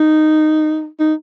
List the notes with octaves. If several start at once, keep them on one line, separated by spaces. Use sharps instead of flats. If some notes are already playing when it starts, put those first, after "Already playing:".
Already playing: D#4
D#4